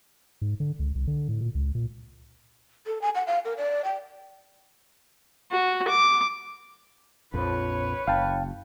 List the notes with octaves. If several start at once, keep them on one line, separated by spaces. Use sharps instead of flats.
G#2
D3
C#2
C2
D3
A2
A#2
C#2
A#2
A4
G#5
F#5
F5
A#4
D5
G5
F#4
D6
A#1 F2 F3 B4 C#5
F#1 F5 G5 A5